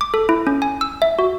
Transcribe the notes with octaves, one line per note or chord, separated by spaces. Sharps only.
D6
A4
E4
C#4
G#5
E6
E5
F#4